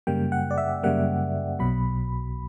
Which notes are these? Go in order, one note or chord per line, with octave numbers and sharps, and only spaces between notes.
F#2 C#3 G3 A#3 G5
F#5
D5
E5
F#2 C#3 G3 A#3 F#5
B1 B2 F#3 B5